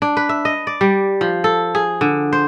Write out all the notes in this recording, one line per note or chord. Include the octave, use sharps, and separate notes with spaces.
D4
B4
E5
D#5
D5
G3
F3
A4
G#4
D3
C5